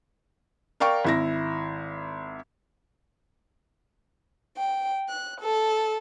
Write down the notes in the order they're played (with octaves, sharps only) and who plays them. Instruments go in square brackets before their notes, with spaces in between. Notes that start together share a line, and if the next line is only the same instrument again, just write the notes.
[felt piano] A#4 D5 F5 G5 C#6
G#1 E4 A#6
[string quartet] G5
F#6
A4